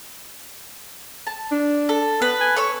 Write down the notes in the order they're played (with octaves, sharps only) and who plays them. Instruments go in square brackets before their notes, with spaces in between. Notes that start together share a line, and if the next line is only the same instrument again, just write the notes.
[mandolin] A5
[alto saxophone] D4
[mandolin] A4
[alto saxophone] B3 [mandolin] B4
[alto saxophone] G#5
[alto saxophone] A4 [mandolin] C#5 C#6 E6